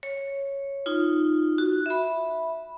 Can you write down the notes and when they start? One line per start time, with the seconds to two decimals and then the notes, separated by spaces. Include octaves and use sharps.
0.03 C#5
0.86 D#4 F4
1.58 F#4
1.86 E5 B5